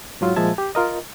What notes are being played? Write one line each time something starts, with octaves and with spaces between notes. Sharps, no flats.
G#2 F#3 F4
A#2 F3 G#3 E5 A5 G#6
G4
F4 A#4 D#5